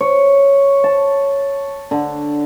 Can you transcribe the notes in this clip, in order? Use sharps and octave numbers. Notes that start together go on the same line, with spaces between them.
C#5
A5
D3